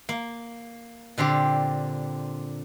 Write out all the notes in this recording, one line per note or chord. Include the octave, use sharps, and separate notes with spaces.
A#3
A#2 D3 C4 G4